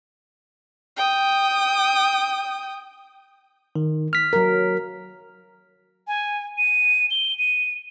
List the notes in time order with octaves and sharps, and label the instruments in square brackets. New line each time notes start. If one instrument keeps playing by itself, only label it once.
[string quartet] G5 D#6
[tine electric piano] D#3
F6 B6
[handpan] F#3 A#4
[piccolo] G#5
D#7
G7
D#7